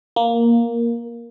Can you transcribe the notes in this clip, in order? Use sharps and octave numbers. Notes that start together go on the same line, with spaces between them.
A#3